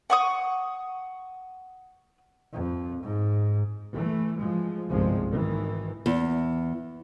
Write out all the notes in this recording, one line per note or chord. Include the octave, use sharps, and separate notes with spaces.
F#5 C#6 D#6
F2
G#2
E3 A3
F3 G#3
G1 C2 G#2 C3 F3 G#3
G#1 D#3 E3
E2